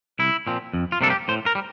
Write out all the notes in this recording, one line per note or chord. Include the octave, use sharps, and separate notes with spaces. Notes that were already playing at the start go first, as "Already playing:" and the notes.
C2 E4
A#2 F3 C4
F2
F4
C3 G3 A#3 D4 A4
G4
A2 C5
A#4
G3